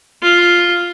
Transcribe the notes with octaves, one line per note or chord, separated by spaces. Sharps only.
F4